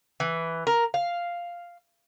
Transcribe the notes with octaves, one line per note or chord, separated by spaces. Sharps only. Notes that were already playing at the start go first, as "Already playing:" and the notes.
E3
A#4
F5